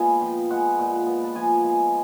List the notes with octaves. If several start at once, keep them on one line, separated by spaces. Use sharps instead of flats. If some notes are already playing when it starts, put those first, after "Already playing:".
Already playing: A#2 G#3 B3 F5 G#5
F3 G5
G#3 F#5
A#2
B3
A5
F3 G#5
G#3